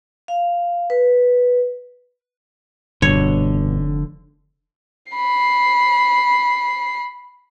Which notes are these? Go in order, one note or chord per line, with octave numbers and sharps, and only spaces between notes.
F5
B4
F1 G2 B2 D3 C#5
B5 C7